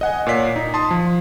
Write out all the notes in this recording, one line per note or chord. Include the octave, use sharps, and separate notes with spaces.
D#5 F#5 G#5
A#2 C#5 D5 B6 C7
D#4
A5 C6 D#6
F3